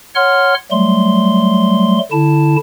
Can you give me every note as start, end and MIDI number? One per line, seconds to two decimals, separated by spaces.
0.15 0.54 73
0.15 0.54 78
0.15 0.54 84
0.15 0.54 89
0.71 1.99 54
0.71 1.99 55
0.71 1.99 57
0.71 1.99 84
2.12 2.56 50
2.12 2.56 64
2.12 2.56 81